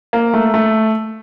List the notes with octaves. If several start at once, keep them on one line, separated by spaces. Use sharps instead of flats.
A#3
A3
A3